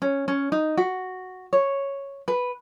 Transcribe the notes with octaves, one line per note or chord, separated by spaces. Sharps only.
C#4
C#4
D#4
F#4
C#5
B4